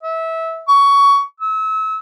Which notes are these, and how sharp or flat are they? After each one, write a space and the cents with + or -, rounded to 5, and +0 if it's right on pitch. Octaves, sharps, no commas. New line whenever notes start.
E5 -20
C#6 +20
E6 -35